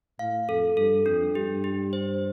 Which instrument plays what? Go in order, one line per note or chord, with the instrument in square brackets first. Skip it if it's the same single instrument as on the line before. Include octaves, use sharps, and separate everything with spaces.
[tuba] A2 [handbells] F5
[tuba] F2 [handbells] A4
[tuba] G2 [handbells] A4
[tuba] F2 [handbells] D4
[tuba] G2 [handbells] G4
[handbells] G4
C5